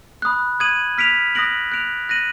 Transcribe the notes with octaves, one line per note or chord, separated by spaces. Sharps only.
B5 D#6 F#6
D#6 G#6 D#7 F#7
F6 B6 D7 F7
D#6 F#6 A#6 D7 F#7
F#6 D7 F7
F#6 A#6 D#7 F#7